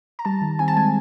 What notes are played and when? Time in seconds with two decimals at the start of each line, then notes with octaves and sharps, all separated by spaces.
0.19 A#5
0.25 G3 A5
0.42 D#3
0.59 C4 G#5
0.68 A5
0.76 G#3 G#5